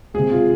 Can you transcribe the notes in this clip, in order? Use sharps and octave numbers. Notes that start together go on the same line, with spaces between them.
C3 G#3 G#4
F4